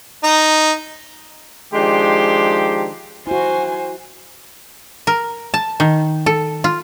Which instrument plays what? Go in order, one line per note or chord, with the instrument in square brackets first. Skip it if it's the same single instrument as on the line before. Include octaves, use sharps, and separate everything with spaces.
[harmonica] D#4
[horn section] D#3 F3 G#3 D4 G4 C6
[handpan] E4 F#4 [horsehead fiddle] C5 G#5
[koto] A#4
A5
D#3
A4
F4